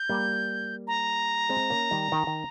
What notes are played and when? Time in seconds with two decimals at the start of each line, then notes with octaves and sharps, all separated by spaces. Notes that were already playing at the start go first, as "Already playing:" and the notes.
Already playing: G6
0.09 G3 A#3
0.87 A#5
1.49 G#3 C4
1.70 A#3 C#4
1.91 D#3 G3
2.12 D#3
2.27 D#3